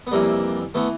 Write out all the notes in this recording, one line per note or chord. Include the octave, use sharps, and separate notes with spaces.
B3
F2 C3 E3 G3 A#3
E3 A3 B3